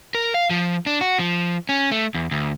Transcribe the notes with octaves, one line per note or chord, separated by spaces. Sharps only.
A#4
F5
F3
D4
F#4
F3
C#4
A3
E2
D2